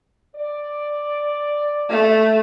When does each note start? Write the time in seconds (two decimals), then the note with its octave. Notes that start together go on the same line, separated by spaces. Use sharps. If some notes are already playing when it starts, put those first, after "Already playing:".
0.36 D5
1.90 A3